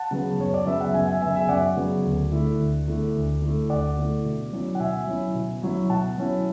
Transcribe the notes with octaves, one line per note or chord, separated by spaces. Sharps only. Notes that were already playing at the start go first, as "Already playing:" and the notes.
Already playing: F#5 A5
C#3 F#3 B3
F#2 C#5
D5
C#3 F#3 B3 E5
F#5
F#2 E5 G#5
E5 G#5
C#3 F#3 B3 E5 G#5
E5 G#5
F#2 D5 F#5
C#3 F#3 B3
D2
D3 A3 E4
D2
D3 A3 E4
D2
D3 A3 E4
D2 D5 F#5
D3 A3 E4
B2
F#3 C#4 E4
F#5
B2 E5 G#5
F#3 C#4 E4
B2
F#3 C#4 E4
B2 F#5 A5
F#3 C#4 E4